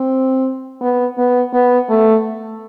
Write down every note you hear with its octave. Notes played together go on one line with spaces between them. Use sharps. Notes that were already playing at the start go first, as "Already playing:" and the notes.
Already playing: C4
B3
B3
B3
A3